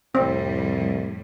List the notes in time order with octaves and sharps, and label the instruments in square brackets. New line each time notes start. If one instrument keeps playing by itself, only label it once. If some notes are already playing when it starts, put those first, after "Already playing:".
[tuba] C2 [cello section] F2 A2 G3 [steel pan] C4